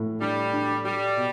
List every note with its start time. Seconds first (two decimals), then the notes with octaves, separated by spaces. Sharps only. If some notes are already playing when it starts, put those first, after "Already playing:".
Already playing: A2
0.21 G3 D4
0.54 D4
0.84 G3 G4
1.17 B2